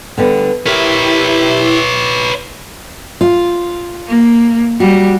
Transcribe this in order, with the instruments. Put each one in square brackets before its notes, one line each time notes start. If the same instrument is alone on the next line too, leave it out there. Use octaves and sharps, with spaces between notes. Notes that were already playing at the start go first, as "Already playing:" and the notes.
[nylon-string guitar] D3 G3 B3
[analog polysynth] E4 G4 E5 [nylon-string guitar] A#4 [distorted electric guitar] B4 C#5
[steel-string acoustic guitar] F4
[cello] A#3
[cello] G3 [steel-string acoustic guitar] F#4